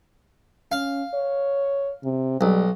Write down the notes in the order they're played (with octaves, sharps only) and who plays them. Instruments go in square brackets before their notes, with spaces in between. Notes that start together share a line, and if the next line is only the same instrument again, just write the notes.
[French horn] C#4 [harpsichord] F5
[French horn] C#5
C3
[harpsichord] B1 [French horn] G3